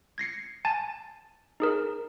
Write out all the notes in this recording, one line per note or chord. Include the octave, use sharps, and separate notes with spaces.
G#6 A#6 C7 C#7
G#5 A5 A6
D#4 G#4 A#4